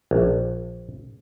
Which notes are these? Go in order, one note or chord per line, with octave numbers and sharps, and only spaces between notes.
A#1